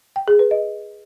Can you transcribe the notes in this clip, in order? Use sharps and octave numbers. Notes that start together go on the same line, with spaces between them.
G5
G#4
B4
D#5